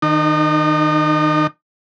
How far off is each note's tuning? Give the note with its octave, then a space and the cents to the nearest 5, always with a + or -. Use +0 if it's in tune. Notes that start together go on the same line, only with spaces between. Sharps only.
D#3 +0 D#4 -40